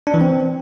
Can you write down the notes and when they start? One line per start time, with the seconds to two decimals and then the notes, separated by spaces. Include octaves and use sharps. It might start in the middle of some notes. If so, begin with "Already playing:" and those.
0.07 D4
0.14 E3
0.21 C4